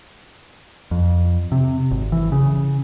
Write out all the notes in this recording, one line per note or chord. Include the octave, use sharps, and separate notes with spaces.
F2
C3
G#1
E3
C#3